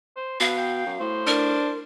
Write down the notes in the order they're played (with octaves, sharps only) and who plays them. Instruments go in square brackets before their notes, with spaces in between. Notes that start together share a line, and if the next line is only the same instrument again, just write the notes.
[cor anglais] C5
[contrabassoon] B2 [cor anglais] B4 [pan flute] F5
[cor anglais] G5
[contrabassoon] F#2
[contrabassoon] A2 [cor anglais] C5
[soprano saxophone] D4 [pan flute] A#4